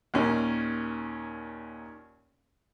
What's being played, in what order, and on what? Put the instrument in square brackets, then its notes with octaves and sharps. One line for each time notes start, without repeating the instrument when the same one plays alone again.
[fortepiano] D#2 A#2 C#4